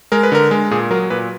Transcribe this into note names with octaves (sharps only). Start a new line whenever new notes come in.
G#3 A#4
B4
D3 A#4
G#3
A#2 G#4
F#3 A#4
A#2 B4